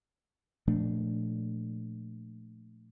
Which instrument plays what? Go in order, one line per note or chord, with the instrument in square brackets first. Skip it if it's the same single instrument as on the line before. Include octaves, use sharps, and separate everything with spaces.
[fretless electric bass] A#2 F3 A3 D4